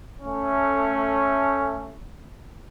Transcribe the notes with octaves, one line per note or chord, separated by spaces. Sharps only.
A3 C#4